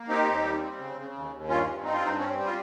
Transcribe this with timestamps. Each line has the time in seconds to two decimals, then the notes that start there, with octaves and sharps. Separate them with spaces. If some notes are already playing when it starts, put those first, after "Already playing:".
Already playing: A#3
0.09 C4 D#4 G4
0.26 D#2
0.44 G3
0.61 C4
0.79 C#3
0.96 C#3
1.14 D#2
1.31 D#2
1.48 G2 C#4 F4
1.67 G2
1.83 C4 D#4
1.93 F4
2.01 G2 D#4
2.18 C4 C#4
2.36 G3
2.45 F4